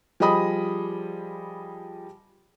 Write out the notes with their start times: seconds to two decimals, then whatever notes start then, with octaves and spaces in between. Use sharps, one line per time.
0.20 F3 G3 G#4 D#5 B5 D#6